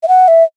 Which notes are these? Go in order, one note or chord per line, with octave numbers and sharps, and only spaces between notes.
E5
F#5
E5